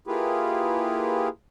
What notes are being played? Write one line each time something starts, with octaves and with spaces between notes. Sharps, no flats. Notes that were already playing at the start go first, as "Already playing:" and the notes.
A#3 E4 F4 G4 G#4 B4